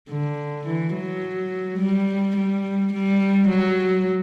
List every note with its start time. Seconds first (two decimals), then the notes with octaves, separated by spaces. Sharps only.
0.10 D3
0.67 E3
0.95 F#3
1.79 G3
2.36 G3
2.93 G3
3.49 F#3